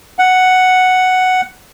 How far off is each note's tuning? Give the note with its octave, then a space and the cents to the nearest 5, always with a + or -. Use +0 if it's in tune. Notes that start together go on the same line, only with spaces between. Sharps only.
F#5 +0